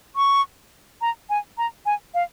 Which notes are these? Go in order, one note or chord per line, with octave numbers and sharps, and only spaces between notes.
C#6
A#5
G#5
A#5
G#5
F5